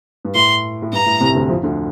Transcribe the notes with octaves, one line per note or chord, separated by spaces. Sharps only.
G2
A2 C6
A2
G2 A#5
A2
C2 C3
D2 D3
F2 F3
D2 D3